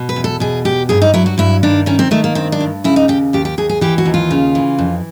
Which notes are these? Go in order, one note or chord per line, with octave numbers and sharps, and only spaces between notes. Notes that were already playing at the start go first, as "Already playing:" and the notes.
Already playing: B2
B4
E2
A4
B2 G#4
E2 G4
G2 G#4
D#4
F#3 E4
F#4
G2 E4
D#3 D4
D#3 C#4
C4
D#3 A3
A#3
G2 C4
D4
G2
C#3 E4
D#4
D#2 G4
D#2 G4
G4
D#2 G#4
G#4
E3 G4
F#4
D#2
F4
C#3
E3
F2